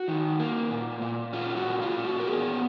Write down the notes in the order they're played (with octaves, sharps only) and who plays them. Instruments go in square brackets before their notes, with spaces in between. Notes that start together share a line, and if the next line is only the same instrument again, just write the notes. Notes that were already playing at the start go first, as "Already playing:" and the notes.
Already playing: [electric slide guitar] F#4
D#3
A#3
A#2
A#2
C#4 F4
F#4
A#2
F4
A#2
F#4
A#4
B3 G#4